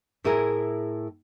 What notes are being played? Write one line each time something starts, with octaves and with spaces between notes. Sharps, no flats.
A2 E4 G#4 A#4